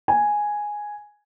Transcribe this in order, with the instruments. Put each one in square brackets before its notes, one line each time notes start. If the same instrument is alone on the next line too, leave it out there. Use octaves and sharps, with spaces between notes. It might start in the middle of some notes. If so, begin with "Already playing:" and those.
[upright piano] G#5